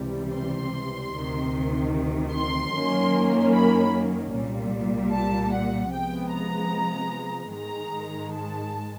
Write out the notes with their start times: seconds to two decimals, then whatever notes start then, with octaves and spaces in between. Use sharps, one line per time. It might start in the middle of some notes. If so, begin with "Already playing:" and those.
Already playing: C#2 C3 E3 G3
0.33 C6
1.13 D2 C3 D#3
2.32 C6
2.73 F#2 D#3 F#3 A#3 C#4
3.52 B5
4.32 C2 A#2 G3
5.13 A5
5.53 F#5
5.92 C3 F3 G#3 B3 G5
6.32 A#5
7.52 G#2 D#3 G#3 A#5
8.32 A5